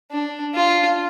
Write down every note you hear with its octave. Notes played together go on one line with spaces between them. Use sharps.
D4
F4